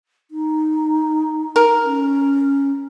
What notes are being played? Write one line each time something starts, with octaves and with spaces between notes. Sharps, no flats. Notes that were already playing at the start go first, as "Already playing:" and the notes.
D#4
A#4
C#4